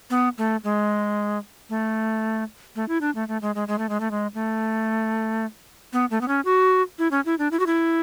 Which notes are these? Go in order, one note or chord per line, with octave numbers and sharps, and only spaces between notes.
B3
A3
G#3
A3
A3
E4
D4
A3
A3
G#3
G#3
G#3
A3
G#3
A3
G#3
A3
B3
A3
B3
C#4
F#4
E4
C#4
E4
D4
E4
F#4
E4